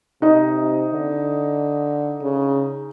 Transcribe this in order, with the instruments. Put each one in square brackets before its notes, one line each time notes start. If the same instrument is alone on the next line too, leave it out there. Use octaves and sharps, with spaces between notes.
[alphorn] C3 [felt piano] D#4 D#5
[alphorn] D3
C#3